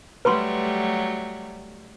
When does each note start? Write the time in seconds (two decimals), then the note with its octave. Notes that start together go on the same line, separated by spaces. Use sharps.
0.25 F#3 G3 A3 B4 B5 C6